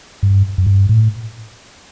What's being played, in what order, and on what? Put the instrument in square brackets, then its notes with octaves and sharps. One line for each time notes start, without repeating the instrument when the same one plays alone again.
[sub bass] G2
F#2
G2
A2